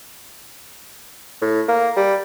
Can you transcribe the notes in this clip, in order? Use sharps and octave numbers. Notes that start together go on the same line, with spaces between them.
A2
A#3
G3